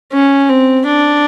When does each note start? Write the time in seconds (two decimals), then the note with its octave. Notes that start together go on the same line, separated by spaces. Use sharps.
0.13 C#4
0.49 C4
0.86 D4